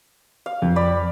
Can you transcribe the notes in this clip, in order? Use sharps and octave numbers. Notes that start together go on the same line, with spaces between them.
F5
F2
D5 B5